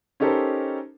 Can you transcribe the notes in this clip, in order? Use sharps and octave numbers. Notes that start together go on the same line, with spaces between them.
C#4 D#4 G4 A4 A#4 C5